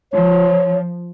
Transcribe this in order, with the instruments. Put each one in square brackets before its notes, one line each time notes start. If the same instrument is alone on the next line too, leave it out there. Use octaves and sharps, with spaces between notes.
[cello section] F3 [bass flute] C#5